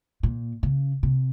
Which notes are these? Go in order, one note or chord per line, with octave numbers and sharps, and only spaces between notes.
A#2
C#3
C3